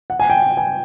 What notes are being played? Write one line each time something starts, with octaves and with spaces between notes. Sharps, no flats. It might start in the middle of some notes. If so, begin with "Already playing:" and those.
F#5
G#5
G5
G#5